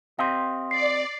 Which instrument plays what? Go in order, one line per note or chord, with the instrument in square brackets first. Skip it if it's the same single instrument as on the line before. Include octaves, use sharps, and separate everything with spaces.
[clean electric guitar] C4 G4 D#5 [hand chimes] F5 C6
[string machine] D5 [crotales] C7